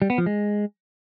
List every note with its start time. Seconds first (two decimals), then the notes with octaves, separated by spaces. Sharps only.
0.02 G3
0.10 B3
0.18 F3
0.26 G#3